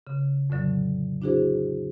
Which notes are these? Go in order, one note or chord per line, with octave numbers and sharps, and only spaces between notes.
C#3
F2 A2 D3 F#3
D4 E4 F#4 G#4 C5